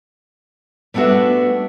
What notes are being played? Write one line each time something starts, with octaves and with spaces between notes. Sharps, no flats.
G3 A3 B3 D4 F#4 E5